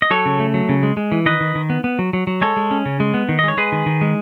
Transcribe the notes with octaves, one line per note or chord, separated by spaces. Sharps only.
D#5
F#3 A4 C#5
C#3
A3
F#3
C#3
G#3
G#3
E3
D#3 B4 D#5
D#3
D#3
B3
B3
F#3
F#3
F#3
G#3 A4 C#5
G#3
C#4
C#3
G#3
B3
D#3
D#5
G#3 C#5
G#3 G#4 B4
D#3
D#3
G#3